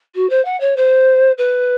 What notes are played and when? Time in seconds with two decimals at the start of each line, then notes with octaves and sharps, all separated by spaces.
0.15 F#4
0.30 C5
0.45 F#5
0.60 C#5
0.77 C5
1.38 B4